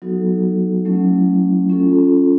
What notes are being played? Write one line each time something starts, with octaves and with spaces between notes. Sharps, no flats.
F#3 B3 D#4 F#4 A4
F#3 A3 C#4 E4
C#4 F4 A4